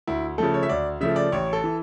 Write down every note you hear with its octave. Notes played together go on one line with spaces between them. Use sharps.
D2 E4
C#3 F3 A3 A4
C#5
E5
D2 D5
C#3 F3 A3 E5
D5
A1 C#5
A4
E3